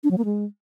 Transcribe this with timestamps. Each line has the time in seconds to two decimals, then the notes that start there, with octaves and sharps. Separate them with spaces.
0.04 D4
0.11 F#3
0.18 A#3
0.25 G#3